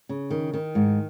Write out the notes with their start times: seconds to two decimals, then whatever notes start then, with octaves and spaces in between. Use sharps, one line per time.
0.09 C#3
0.31 D#3
0.53 D#3
0.75 G#2